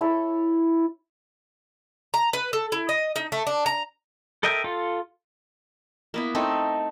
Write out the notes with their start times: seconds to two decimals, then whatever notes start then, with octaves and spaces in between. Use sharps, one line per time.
0.01 E4 A4 C#5
2.14 A#5
2.33 B4
2.53 A4
2.72 E4
2.89 D#5
3.16 D#4
3.32 A3
3.47 D4
3.66 A#5
4.43 A4 A#4 D#5 E5 G5
4.64 F4 A4
6.14 A#3 B3 E4
6.35 A3 C4 D#4 A4